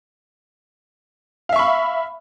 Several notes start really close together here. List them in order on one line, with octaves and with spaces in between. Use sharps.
F5 E5 C#6 B5